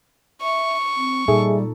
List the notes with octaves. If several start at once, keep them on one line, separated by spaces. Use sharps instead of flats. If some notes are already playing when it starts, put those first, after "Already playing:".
E5 C#6
C4
A#2 G3 D#4 G#4 A4 E5